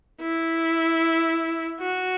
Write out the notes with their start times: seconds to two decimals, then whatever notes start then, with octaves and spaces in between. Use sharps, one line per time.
0.21 E4
1.80 F#4